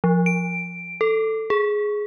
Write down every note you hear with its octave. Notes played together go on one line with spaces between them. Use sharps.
F3
D7
A4
G#4